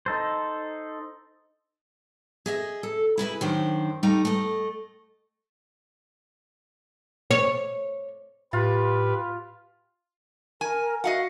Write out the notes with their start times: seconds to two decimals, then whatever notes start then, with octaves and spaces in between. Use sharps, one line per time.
0.06 D#4 A4 C5
2.46 G#4 D#5 E5
2.83 A4
3.18 E4 G#4 B4 E5
3.41 F#2 D#3 D4 C5
4.03 G3 A3 D#4
4.25 A3 D#5
7.31 C#5
8.53 A2 F4 G4 B4
10.61 A#4 G#5
11.04 F#4 D#5 F5 F#5